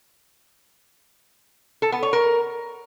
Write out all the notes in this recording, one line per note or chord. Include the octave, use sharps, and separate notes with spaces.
A4
B3
C#5
A#4